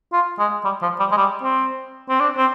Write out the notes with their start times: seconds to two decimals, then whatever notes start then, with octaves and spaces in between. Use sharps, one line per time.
0.13 F4
0.39 G#3
0.65 G3
0.82 F3
1.00 G3
1.12 G#3
1.17 G3
1.43 C4
2.09 C4
2.20 D4
2.37 C4